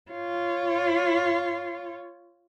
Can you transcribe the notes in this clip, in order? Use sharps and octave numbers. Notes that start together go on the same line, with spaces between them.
F4 C#5